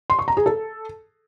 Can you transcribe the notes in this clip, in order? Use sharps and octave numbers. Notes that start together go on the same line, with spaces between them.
C6
C#6
A#5
G#4
A4